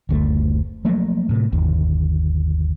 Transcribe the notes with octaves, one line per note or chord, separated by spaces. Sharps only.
F#1 D2 A3
F3 F#3 A3 A#3
A2 C3
G1 D#2